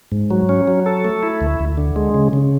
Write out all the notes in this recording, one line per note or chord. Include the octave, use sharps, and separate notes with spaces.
G#2
F#3
C#4
F#3
A4
A3
E4
D2
D2
D3
G#3
C#3
C#3